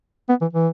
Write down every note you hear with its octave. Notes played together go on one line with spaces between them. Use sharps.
B3
E3
E3